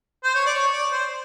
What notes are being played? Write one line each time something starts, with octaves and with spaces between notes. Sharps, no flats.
C5
C#5
D5
C#5
D5
C5